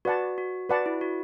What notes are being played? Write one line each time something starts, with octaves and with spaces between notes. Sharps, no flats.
F#4 B4 D5 F#5 A5
F#4
F#4 B4 D5 F#5 A5
E4
F#4